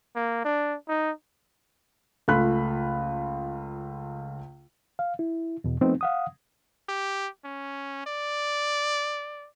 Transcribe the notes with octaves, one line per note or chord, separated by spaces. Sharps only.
A#3
D4
D#4
C#2 A3 F4 B5 F#6 B6
F5
E4
E2 B2
F3 A3 B3 C4 D#4
F5 F#5 D#6
G4
C#4
D5